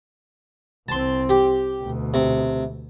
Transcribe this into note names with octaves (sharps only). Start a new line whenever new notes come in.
C2 C4 A5 C6
G4
D2 B2
C3